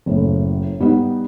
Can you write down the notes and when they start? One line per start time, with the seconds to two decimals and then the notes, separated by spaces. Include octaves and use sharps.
0.06 F#1 A2
0.80 G3 B3 D#4